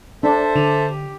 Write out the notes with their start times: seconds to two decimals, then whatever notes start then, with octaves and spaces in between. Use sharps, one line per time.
0.23 D4 A4 C5 E5
0.56 D3
0.90 G4